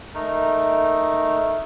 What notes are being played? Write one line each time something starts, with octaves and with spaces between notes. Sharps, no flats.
A3 D#4 A#4